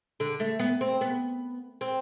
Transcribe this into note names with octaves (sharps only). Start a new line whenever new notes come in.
D3
A3
B3
C4
B3
C4